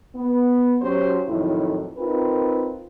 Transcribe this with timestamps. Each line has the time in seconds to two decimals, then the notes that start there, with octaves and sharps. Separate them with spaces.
0.16 B3
0.81 F#3 C#4 F#4 G4 C5 C#5
1.28 F2 A2 D#3 F#3 E4
1.97 C4 D#4 F4 A#4 B4